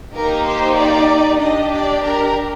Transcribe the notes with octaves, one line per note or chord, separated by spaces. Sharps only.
A#3 D#4 G4 A#4
C5
D5
D4 G4 D#5
D5
A#4